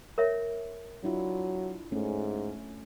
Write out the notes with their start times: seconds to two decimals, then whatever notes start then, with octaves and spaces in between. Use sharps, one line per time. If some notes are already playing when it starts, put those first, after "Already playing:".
0.18 A#4 C#5 E5
1.04 F#3 D4 E4 F4
1.92 G#2 A3 C#4